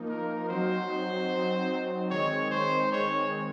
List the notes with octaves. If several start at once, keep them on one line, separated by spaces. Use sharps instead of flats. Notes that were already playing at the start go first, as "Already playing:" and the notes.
Already playing: F3 A#3 D#4
A#4
F#3 C4 D#4 F#4 C5
F#3 C4 D#4 F#4
D#3 G#3 C4 D#4 C#5
C5
D#3 G#3 C4 D#4 C#5